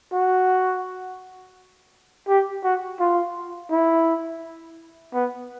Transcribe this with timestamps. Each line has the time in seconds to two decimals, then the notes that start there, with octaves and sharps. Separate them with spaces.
0.13 F#4
2.28 G4
2.64 F#4
3.00 F4
3.71 E4
5.14 B3